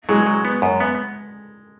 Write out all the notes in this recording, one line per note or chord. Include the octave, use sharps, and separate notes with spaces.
F#3 G#3
F#3
B3
F#2
B3